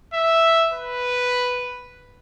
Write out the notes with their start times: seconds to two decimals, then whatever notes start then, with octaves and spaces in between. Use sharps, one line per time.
0.14 E5
0.72 B4